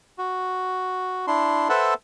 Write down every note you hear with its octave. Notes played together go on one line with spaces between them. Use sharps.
F#4
D4 E4 C6
A4 B4 C5 E5 F#5 A5